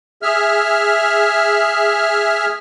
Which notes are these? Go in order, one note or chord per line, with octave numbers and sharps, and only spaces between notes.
G#4 E5 F6